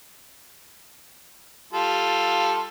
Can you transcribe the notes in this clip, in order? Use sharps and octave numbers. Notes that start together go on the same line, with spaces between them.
G3 F4 A4